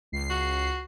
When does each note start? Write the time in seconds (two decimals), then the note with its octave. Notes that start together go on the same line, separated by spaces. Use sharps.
0.12 C#2 C7
0.30 F#4